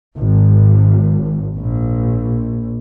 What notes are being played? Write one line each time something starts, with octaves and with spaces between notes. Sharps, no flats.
G#1
A#1